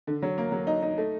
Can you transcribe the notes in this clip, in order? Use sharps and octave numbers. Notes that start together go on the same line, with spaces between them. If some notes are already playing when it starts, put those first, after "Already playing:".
D3
F#3
A#3
F#3
D#4
D#4
A3